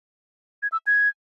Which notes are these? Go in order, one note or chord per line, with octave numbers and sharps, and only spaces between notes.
G#6
E6
G#6